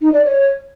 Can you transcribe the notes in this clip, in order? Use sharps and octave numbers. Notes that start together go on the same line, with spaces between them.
D#4
D5
C#5